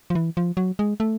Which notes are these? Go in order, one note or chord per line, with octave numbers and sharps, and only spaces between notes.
F3
E3
F3
F#3
G#3
A3